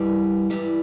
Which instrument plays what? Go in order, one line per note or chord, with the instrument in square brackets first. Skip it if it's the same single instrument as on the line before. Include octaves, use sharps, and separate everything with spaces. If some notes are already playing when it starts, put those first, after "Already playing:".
Already playing: [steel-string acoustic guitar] G2 E3 G3
G2 E3 G3